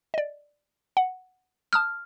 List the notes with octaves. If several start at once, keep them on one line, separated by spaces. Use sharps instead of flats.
D5 D#5
F#5
A5 D#6 F6 F#6